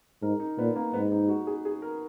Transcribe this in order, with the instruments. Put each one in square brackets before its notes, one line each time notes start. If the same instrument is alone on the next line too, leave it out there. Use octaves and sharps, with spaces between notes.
[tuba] G#2 [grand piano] A#4
[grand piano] D#4
[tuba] A#2 [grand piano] B3
[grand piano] A#3
[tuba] G#2 [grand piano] B3
[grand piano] D#4
F#4
G#4
G#4
A#4